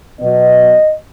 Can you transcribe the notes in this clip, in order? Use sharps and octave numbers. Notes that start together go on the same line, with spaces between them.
B2 F#3 B3 D#5